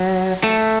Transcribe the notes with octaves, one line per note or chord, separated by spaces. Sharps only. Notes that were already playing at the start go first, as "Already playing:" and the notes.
Already playing: F#3
A3